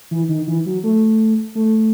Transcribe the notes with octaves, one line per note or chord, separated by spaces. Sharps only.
E3
D#3
E3
F#3
A3
A3